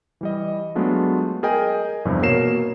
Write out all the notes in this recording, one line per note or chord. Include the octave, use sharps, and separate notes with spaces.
E3 G3 D#5
F#3 G#3 A3 B3 D4 F4
G#4 A#4 D#5 G5 G#5
E2 G2 C3 F3
B2 A#3 A#4 C#5 C7 E7